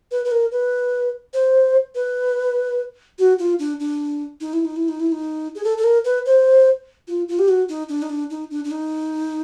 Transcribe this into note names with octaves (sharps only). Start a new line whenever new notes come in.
B4
B4
A#4
B4
C5
B4
F#4
F4
D4
D4
D#4
E4
D#4
E4
D#4
E4
D#4
G#4
A4
A4
A#4
B4
C5
F4
F4
G4
F#4
D#4
D4
D#4
D4
D#4
D4
D4
D#4